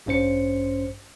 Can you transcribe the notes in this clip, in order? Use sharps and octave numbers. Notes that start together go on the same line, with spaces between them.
A1 G2 C#4 C5 C#7